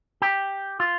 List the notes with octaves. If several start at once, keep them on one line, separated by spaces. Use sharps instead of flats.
G4
F4